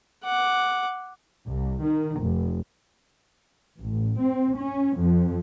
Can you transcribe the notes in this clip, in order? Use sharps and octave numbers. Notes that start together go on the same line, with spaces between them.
F#5 D6
C2
D#3
F1
A1
C4
C#4
F2